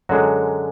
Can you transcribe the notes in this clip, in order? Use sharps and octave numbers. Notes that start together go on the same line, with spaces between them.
F#2 D3 F#3 G#3 F#4